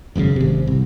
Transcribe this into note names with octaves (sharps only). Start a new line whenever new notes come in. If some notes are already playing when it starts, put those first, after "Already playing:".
G#1 F#2 A#2 C#3
G#1 C3
C2